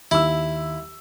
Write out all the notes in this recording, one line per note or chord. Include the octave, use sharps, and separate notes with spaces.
D#2 E4 E6